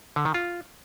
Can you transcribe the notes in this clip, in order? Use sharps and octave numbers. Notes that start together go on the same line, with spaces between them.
D3
D#3
F4